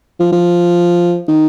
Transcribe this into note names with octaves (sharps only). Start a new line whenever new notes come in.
F3
F3
D#3